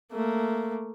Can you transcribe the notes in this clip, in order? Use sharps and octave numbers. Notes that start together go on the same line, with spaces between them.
A3 A#3